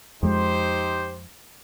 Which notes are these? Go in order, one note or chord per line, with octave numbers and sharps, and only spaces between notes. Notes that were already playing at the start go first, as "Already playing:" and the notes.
F2 G#3 D#4 G4 C5